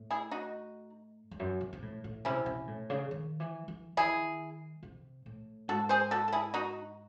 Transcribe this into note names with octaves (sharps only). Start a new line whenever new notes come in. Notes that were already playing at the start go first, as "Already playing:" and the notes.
Already playing: A2
E4 G#4
D#4 F#4
E2
F#2
C3
C3
A2
A2
C3 C#4 E4
C3
A2
C#3
D#3
E3
E3
D#3 E4 G#4
C3
A2
G#2 F#4 A4
G#4 C5
F#4 A4
A4
E4 G#4
D#4 F#4